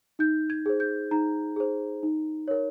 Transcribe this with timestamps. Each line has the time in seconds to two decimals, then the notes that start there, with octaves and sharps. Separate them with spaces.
0.19 D#4 G6
0.50 G#6
0.66 G#4 C5
0.80 G6
1.11 D#4 A#5
1.56 G#4 C5
2.03 D#4
2.48 A#4 C#5